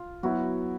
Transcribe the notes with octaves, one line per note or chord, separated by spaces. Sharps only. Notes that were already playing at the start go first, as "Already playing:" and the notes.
Already playing: F4
F#3 B3 E4 F#4